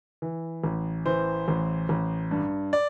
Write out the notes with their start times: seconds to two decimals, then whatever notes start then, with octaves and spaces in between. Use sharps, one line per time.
0.22 E3
0.64 A1
1.06 E3 C5
1.48 A1
1.89 A1
2.31 G2
2.73 D5